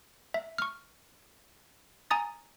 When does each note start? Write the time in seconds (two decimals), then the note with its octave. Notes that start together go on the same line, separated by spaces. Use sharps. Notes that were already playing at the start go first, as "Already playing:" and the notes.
0.34 E5
0.58 C#6 F6
2.11 G#5 A#5 D#6 A6